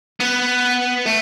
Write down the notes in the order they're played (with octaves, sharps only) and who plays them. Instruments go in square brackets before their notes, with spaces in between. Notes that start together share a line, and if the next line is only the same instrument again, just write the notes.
[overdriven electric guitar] B3
A3